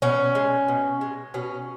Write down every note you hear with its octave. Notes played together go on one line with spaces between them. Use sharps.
B2 C#4
G#3
B2
G#3
B2 C#4